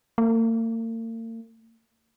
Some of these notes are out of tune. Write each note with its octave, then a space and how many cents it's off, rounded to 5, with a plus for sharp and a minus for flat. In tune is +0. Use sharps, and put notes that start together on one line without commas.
A#3 -45